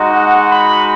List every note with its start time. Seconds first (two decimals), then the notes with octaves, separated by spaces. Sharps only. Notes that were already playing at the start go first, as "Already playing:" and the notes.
Already playing: G#3 D#4 F#4
0.14 F#5
0.50 B5